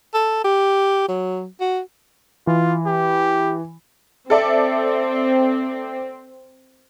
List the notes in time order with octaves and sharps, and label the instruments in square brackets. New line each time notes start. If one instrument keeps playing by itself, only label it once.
[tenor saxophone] A4
G4
F#3
F#4
[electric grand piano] E3 [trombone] F4
[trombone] G4
[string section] C4 [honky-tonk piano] A4 D5 E5